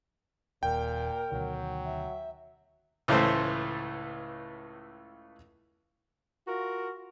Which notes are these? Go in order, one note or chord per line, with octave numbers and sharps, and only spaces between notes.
D#1 D#2 A#2 A#4 G5
D2 B2 D#3 F#3
E5
C#2 A2 E3 A3 C5
F4 F#4 A#4